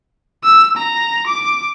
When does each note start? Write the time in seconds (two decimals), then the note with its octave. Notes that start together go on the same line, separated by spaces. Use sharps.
0.44 E6
0.76 A#5
1.27 D6